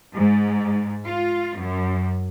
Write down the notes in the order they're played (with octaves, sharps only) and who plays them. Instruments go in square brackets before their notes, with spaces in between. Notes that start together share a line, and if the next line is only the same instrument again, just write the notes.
[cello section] G#2
F4
F#2